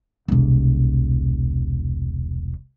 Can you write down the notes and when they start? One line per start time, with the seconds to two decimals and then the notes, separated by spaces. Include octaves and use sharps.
0.28 E1 C2